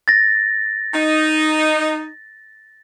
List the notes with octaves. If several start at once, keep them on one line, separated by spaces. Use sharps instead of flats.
A6 A#6
D#4